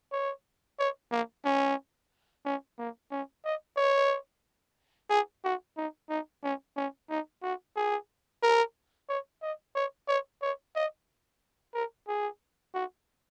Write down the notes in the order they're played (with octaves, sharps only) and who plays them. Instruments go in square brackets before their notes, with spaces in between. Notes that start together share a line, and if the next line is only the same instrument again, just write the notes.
[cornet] C#5
C#5
A#3
C#4
C#4
A#3
C#4
D#5
C#5
G#4
F#4
D#4
D#4
C#4
C#4
D#4
F#4
G#4
A#4
C#5
D#5
C#5
C#5
C#5
D#5
A#4
G#4
F#4